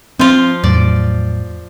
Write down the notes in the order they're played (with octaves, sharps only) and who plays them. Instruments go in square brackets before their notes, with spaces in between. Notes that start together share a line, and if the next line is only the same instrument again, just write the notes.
[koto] F3 F4 [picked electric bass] C4
[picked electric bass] E2 A2 F#3 [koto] D5